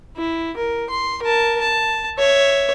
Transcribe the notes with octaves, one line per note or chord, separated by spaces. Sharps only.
E4
A#4
C6
A#4 A5
A5
C#5 E5